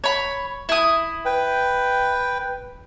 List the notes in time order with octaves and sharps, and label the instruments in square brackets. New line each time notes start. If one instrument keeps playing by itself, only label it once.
[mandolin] C#5 B5
E4 D#6
[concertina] B4 G5